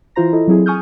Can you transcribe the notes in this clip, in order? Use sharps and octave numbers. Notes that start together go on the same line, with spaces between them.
E3 E4 F4 C5 A#5 A#6
E4 A4 D#5
F#3 C4 E4 G#4
G#5 C#6 D#6 F6 G6